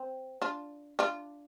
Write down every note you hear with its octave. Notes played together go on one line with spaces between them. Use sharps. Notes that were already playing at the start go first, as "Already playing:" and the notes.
Already playing: C4
D4 F4
D4 F4